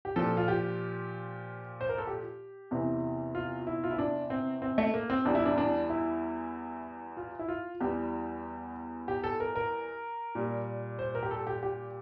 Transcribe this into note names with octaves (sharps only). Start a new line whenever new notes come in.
G4
A#2 F3 A4
F4
G4
C5
A#4
A4
G4
E2 C3 E3
F4
E4
F4
E4
D4
C4
C4
A3
A#3
C4
E2 E3 G3 D4
E4
D4
D4
E4
F4
E4
F4
E2 E3 G3 G4
G4
A4
A#4
A#4
A#2 G3
C5
A#4
G4
A4
G4
G4